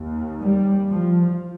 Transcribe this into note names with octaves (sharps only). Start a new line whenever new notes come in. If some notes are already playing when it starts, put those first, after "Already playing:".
Already playing: D#2
G3
F3